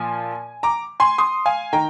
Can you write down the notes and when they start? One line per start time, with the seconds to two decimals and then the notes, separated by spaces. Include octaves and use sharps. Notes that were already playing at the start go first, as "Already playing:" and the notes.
Already playing: A#2 F3 G#5
0.63 A#5 D6
1.00 G#5 C6
1.18 C6 D#6
1.46 F5 G#5
1.73 D#3 G5 A#5